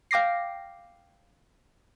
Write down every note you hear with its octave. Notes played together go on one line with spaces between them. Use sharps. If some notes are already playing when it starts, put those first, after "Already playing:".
F5 G5 D6 A#6 C7